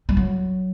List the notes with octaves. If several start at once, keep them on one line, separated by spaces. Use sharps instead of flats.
G3
F#3